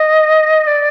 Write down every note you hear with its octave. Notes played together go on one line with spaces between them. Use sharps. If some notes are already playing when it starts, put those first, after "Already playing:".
Already playing: D#5
D5